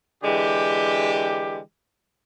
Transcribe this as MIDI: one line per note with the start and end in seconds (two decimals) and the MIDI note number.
0.24 1.59 50
0.24 1.59 52
0.24 1.59 56
0.24 1.59 67